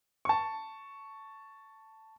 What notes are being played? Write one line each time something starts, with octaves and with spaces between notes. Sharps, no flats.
A5 C#6